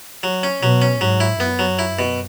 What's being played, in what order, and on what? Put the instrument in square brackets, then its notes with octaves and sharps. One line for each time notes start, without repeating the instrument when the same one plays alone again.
[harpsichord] F#3
C#4
[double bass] B2 [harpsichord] F#3
[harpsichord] C#4
[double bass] G#2 [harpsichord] F#3
[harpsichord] E4
[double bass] F#2 [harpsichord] B3
[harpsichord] F#3
E4
B2